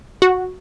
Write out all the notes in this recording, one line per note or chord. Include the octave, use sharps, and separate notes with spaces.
F#4